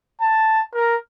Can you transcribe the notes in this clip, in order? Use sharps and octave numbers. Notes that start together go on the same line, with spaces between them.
A5
A#4